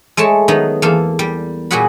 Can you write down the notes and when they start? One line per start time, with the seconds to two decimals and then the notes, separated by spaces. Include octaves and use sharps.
0.17 G#3 A3 C#5 A5
0.48 D#3 F#3 B3 D#4
0.82 E2 A#3 A4 F5
1.19 G3
1.71 A#2 G3 F#4 G#4 F#5 B5